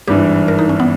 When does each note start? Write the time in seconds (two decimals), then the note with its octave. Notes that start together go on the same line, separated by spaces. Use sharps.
0.08 G#1 G2 E3 G4
0.48 A#4
0.59 D#4
0.69 C#4
0.80 B3